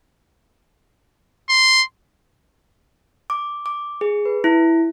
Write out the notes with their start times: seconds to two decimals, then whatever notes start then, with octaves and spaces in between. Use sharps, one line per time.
1.49 C6
3.30 D6
3.66 D6
4.01 G#4
4.25 B4
4.44 E4